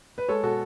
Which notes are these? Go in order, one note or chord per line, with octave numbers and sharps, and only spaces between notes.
B4
G#3 A4 C#5
B2 F#4 A4